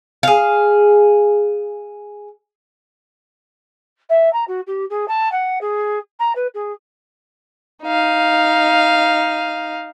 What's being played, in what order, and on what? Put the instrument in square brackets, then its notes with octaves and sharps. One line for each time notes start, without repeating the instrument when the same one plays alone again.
[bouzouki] G#4 F5
[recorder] E5
A#5
F#4
G4
G#4
A5
F#5
G#4
A#5
B4
G#4
[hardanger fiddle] D#4 F5